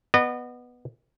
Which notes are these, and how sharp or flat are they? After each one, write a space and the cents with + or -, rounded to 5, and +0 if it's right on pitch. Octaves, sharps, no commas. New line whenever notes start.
B3 +0 D#5 -35